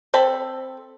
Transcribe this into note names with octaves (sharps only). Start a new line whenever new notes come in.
C4 A4 B5